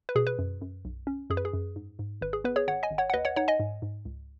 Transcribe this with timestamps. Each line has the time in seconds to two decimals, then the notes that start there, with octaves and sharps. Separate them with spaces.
0.09 B4
0.15 B2 G#4
0.27 B4
0.39 F#2
0.61 F#2
0.85 B1
1.07 C#4
1.30 F#2 G#4
1.37 B4
1.45 G#4
1.53 F#2
1.76 G#2
1.99 G#2
2.21 G#1 B4
2.33 G#4
2.44 B3 B4
2.56 G#4 C#5
2.68 G#1 C#5 F#5
2.83 D#5 G#5
2.91 G#1
2.98 C#5 F#5
3.10 F#5
3.14 D#2 B4 D#5
3.25 C#5 F#5
3.36 D#4 C#5 F#5
3.48 D#5 G#5
3.59 G#2
3.82 G#2
4.05 C#2